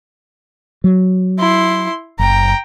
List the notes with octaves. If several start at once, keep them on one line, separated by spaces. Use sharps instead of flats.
F#3
E4 C6
F#1 G5 A#5